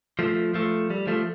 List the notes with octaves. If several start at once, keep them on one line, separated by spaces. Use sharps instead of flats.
F3 A3
F3 A3
G3
F3 A3